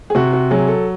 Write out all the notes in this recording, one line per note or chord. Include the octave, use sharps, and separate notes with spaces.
G#4
C3 F#4
F#4
F#3 G#4
A4